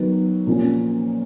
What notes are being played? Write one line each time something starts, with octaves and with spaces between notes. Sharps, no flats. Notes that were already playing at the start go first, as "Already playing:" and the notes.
Already playing: D#3 F#3 B3
A#2 F3 A#3 C#4